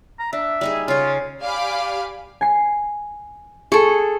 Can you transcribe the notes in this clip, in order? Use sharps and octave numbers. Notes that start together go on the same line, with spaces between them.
A#5
D4 E5
G3 D#4 G#4
C#3 F4 C#5
G4 D5 F5 G#5 B5 D6
G#5 C7
G#4 A4 C#6